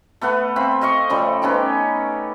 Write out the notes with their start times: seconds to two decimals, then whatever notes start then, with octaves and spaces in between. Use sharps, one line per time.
0.21 A3 B3 B4 F#5
0.56 C4 E5 F5 B5
0.81 C5 D#5 F5 C#6
1.10 C#3 F3 G3 A3
1.42 B3 C#4 D#4 G4